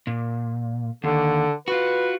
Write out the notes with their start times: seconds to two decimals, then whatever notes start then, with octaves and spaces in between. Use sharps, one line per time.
0.07 A#2
1.04 D#2 D3
1.68 F4 F#4 B4